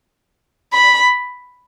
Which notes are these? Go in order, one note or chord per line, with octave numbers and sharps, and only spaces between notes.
B5